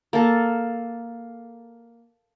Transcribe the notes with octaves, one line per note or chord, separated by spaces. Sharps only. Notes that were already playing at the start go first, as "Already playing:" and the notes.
A#3 A4